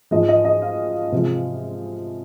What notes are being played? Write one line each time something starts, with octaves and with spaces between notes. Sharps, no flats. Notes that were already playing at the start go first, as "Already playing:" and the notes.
G#2 F3 G#3 D#5
D#5
D#5
F5
C3 F3 G#3